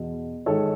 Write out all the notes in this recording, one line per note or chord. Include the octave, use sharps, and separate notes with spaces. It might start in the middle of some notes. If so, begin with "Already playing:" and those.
Already playing: E2 B2
G#2 D#3 A4 C#5